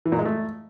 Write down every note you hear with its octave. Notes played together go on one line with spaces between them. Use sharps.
E3
A#2
G#3
A3